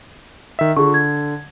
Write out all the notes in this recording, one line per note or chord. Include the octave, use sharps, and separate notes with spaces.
D#3 E5
D3 F4 G#4 C#6
G#6